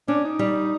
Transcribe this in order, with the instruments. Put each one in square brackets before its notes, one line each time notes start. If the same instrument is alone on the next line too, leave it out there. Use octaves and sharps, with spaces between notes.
[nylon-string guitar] C#4 [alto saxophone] D4
[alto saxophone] D#4
[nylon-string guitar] G3